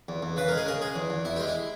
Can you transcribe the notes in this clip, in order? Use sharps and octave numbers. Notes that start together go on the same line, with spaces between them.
E2
E2
C#3 B4
G#3 A#4
G#4
C#3 A#4
G#3 G#4
E2
E2
E2 E4
G#3 G4
E4